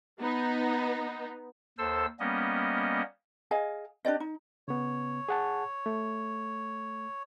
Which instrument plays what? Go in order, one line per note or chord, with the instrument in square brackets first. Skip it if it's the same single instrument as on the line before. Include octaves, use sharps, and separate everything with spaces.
[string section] B3 D#4
[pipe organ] D#2 A4 C5 E6
G3 A#3 B3 C#4 D#5
[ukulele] G#4 D#5 F5 G#5
D4 G4 D5 D#5
D#4
[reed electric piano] C#3 B3 [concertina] C#5
[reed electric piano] G#4 F#5 A5
A3